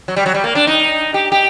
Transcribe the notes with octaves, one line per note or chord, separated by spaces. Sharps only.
F#3
G3
F#3
G3
A#3
D4
D#4
G4
G4